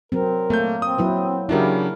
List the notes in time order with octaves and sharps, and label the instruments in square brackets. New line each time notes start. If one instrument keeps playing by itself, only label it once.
[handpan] F#3 C4 [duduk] A#4
[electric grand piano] A3 G6 [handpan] A#3
[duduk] C4 [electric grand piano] D#6
[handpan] F#3 E4 B4
[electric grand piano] C#3 F#3 D4 [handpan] E4 A#4 [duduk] G4